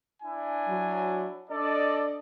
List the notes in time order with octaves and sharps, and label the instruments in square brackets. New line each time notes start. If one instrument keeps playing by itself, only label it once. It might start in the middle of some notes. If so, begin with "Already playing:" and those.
[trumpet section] D4 E4 G#5
[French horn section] F#3
[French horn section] D4 D#5 [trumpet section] A4 D5